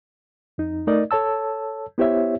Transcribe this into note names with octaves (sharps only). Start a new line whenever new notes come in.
F2 D#4
A3 D#4 A#4 D5 D#5
A4 C#5 A5 E6
B3 E4 G4 C5 C#5 E5